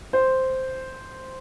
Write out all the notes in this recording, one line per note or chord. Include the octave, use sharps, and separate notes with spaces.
C5